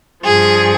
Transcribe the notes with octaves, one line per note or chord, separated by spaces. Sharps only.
G2 F3 G#4